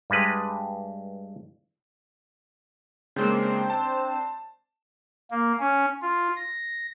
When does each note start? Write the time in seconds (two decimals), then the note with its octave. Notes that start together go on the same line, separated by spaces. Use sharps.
0.10 G2 G3 G#3 B4
3.16 C#3 G#3 A#3 C4 D4 C5
3.70 A5
5.31 A#3
5.59 C#4
6.02 F4
6.36 A#6